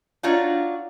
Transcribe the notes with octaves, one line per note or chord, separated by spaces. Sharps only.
D4 D#4 F4 F#4 C#5 D5